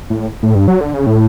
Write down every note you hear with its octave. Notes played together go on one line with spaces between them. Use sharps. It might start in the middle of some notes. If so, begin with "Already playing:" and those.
A2
A2
G2
F#3
D3
C#3
A2